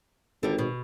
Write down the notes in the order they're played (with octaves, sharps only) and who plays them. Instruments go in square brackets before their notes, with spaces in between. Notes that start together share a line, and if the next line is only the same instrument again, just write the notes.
[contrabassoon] G#1 [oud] D3 G3
[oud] B2